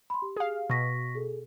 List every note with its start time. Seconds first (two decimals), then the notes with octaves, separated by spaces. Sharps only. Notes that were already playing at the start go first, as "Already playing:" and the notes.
0.10 B5 C6
0.22 G4
0.37 G#4 F5
0.70 B2 C#6 A#6 B6
1.15 G#4 A4